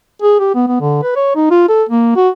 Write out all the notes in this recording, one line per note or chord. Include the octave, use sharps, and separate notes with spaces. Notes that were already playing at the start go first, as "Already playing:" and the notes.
G#4
G4
B3
B3
D3
B4
C#5
D#4
F4
A4
A#3
F#4